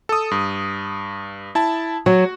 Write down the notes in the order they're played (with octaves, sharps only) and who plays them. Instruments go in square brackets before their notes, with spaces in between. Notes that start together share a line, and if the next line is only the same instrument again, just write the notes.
[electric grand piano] A4 D#6
G2
E4 A5
[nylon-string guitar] F#3 [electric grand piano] F#4